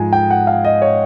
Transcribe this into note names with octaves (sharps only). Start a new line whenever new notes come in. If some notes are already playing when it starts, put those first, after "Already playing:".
Already playing: G#2 F3 G#3 G#5
G5
F#5
F5
D#5
C#5